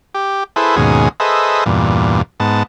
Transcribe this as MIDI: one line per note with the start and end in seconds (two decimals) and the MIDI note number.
0.14 0.44 67
0.56 0.76 64
0.56 0.76 68
0.56 0.76 69
0.56 0.76 71
0.56 0.76 72
0.76 1.09 39
0.76 1.09 44
0.76 1.09 47
0.76 1.09 61
0.76 1.09 68
1.20 1.64 68
1.20 1.64 69
1.20 1.64 71
1.20 1.64 72
1.20 1.64 75
1.20 1.64 76
1.66 2.22 40
1.66 2.22 43
1.66 2.22 46
2.40 2.63 44
2.40 2.63 59
2.40 2.63 81